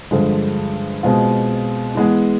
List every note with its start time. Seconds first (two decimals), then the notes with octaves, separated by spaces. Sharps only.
0.11 G2 D3 F3 G#3
1.03 B2 G#3 C4 F4
1.95 E3 G#3 B3